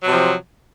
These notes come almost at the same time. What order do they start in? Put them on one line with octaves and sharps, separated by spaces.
F#3 C3 F3